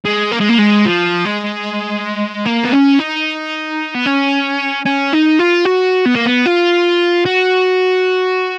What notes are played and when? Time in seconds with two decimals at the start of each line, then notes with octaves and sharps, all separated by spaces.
0.05 G#3
0.32 A#3
0.41 G#3
0.50 A#3
0.59 G#3
0.86 F3
1.25 G#3
2.46 A#3
2.64 B3
2.72 C#4
2.99 D#4
3.94 B3
4.06 C#4
4.85 C#4
5.13 D#4
5.39 F4
5.65 F#4
6.06 B3
6.15 A#3
6.26 B3
6.46 F4
7.26 F#4